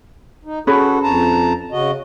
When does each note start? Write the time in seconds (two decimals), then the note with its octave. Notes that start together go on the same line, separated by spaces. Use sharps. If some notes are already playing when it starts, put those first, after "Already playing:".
0.45 D#4
0.67 C#4 F#4 G#4 A4 B4
1.03 F2 A5 A#5
1.72 C#3 F#4 D#5